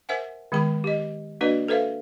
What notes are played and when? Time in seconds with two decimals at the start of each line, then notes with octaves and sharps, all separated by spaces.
0.09 A#4 C5 E5 F#5 G#5
0.52 D#3 G#3 B3 G#4 B5
0.84 G4 D#5
1.41 A#3 D4 F#4 B4 D5 D#5
1.68 A4 B4 C5 E5 F5